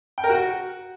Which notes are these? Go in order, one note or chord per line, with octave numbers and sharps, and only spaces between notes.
G5
A#4
F#4